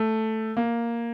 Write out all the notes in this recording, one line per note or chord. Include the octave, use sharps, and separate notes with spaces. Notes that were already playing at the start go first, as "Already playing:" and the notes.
Already playing: A3
A#3